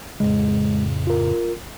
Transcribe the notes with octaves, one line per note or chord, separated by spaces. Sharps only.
F2 A2 C#3 G#3
F4 A#4